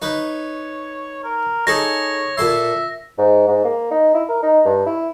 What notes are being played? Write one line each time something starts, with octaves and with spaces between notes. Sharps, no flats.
D#4 B4 C#5
A#4
D#4 G#4 A4 C#5 A#6
A#2 A4 E5 C6
G#2
G#2
A#3
D#4
E4
A#4
D#4
G2
E4